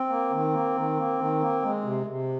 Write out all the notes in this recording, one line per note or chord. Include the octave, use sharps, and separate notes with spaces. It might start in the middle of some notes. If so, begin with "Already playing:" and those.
Already playing: C4
A#3
D#3
A#3
D#3
A#3
D#3
A#3
G#3
C3
C3